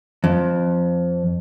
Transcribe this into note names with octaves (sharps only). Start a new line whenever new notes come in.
F2